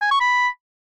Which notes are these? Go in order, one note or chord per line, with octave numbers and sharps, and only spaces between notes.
G#5
C#6
B5